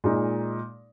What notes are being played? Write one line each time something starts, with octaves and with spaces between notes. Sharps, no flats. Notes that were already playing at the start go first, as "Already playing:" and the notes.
A#2 G#3 D#4